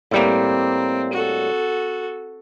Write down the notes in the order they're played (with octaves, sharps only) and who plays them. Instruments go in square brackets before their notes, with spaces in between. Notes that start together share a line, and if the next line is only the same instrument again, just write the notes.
[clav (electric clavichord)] A2 G3 A#3 [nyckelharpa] C4
[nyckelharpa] F#4 A4